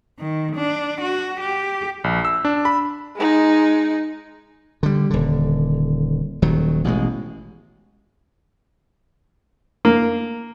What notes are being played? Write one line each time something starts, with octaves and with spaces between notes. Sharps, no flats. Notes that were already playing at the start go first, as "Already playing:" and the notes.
D#3
D4
F#4
G4
A#1
E6
D4
B5
G#3 D#4
D3 G3
D#1 D3
D#1 D#3 F#3
A1 B2 F3 G#3
A#3